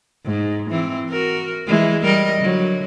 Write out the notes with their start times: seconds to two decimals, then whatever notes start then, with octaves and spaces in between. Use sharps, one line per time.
0.25 G#2
0.70 E3 C4
1.10 F#4 A#4
1.67 E3 G#3
2.04 G3 A#4 D#5
2.41 D3 F#3